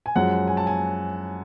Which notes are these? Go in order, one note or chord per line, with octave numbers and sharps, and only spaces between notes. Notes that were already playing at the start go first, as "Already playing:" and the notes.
G#5
F#2 F3 G#3 F#5
G#5
A5
G#5